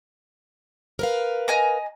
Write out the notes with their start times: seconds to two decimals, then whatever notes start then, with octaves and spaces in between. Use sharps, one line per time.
0.99 A#4 B4 F5
1.48 D#5 G#5 A#5